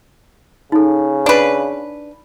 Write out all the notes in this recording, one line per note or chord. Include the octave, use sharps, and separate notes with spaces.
C#3 D#4 A4
D4 B4